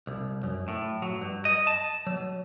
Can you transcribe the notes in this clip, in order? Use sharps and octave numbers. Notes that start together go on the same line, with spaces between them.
C2
F#2
A2
F#3
G2
D#5
A5
F#3